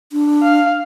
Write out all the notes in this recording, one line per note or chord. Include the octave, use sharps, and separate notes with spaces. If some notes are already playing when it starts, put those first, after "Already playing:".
D4
F5